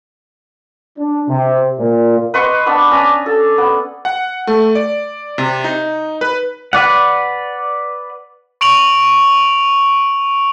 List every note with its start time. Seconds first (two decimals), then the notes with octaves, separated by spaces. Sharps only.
0.97 D4
1.28 C3
1.79 A#2
2.34 B4 D#5 C6 C#6
2.66 B3 D4 E6
2.91 C#4 D4 A#5 D#6
3.26 A4
3.58 B3
4.05 F#5
4.47 A3
4.75 D5
5.38 C3
5.64 D#4
6.21 B4
6.73 B4 D5 F#5
8.61 C#6 D7 F7 F#7